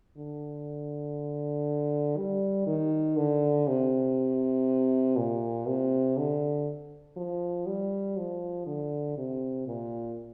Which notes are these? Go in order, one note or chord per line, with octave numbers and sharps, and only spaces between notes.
D3
G3
D#3
D3
C3
A#2
C3
D3
F3
G3
F3
D3
C3
A#2